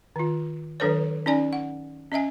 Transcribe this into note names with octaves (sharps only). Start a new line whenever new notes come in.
D#3 F4
D#3 F#3 D4 A4 B4 C#5
C#4 D#4 D5 G#5
F#5
C#4 D#5 E5 G#5